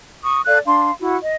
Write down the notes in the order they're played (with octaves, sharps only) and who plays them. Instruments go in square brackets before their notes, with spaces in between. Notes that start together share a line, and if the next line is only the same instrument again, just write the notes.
[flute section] C#6 D#6
A4 D5 F5 F#6
D4 F5 C6
E4 F#4
D#5